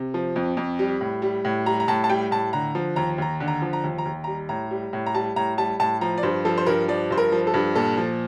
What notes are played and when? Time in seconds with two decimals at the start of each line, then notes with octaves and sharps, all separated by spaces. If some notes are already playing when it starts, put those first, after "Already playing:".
Already playing: C3
0.14 F3
0.36 F2
0.57 F2
0.79 G3
1.01 A2
1.22 G3
1.45 A2
1.66 G3 A#5
1.80 A#5
1.88 A2 A5
2.04 A5
2.10 G3 G5
2.31 A2 A5
2.53 D3 A#5
2.75 F3
2.96 D#2 A#5
3.18 D#2 A#5
3.40 D3
3.48 A#5
3.62 F3
3.73 A#5
3.84 D#2
3.98 A#5
4.05 D#2
4.24 G3 A#5
4.49 A2 A#5
4.71 G3
4.93 A2
5.06 A#5
5.15 G3 A5
5.36 A2 A#5
5.58 G3 A5
5.80 A2 A5
6.01 F3 A#5
6.18 D5
6.23 G2 C5
6.45 F3 A4
6.58 C5
6.66 G2 A#4
6.88 F3 D5
7.10 G2 C5
7.18 A#4
7.32 F3
7.47 A4
7.54 G2
7.75 A#2 A4
7.97 F3